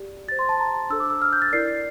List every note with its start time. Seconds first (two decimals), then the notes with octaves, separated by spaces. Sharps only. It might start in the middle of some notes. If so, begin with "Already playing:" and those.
Already playing: G4 D5
0.28 G4 C5 A6
0.39 C6
0.49 A5
0.60 A#5
0.90 D4 A4 C5 E6
1.00 D6
1.10 E6
1.22 F6
1.33 G6
1.42 A6
1.53 E4 A#4 D5 C7